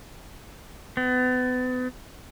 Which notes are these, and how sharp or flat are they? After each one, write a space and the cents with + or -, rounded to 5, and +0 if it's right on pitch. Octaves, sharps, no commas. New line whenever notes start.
B3 +35